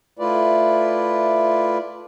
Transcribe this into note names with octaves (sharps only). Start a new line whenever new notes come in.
A3 E4 F4 B4 D5